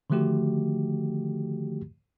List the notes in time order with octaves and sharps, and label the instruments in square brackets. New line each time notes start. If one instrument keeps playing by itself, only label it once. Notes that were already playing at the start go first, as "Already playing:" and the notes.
[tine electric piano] D3 D#3 F3 A3 F#4 G4